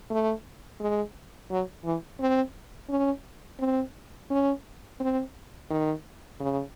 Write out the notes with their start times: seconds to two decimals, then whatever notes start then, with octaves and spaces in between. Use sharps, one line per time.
0.10 A3
0.80 G#3
1.51 F#3
1.84 E3
2.20 C4
2.90 C#4
3.60 C4
4.30 C#4
5.00 C4
5.70 D#3
6.40 C#3